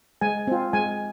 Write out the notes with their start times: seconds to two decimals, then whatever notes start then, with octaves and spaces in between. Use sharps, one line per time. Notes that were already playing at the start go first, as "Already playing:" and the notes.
0.21 G#3 G#5
0.47 C4 F4
0.73 G#3 G#5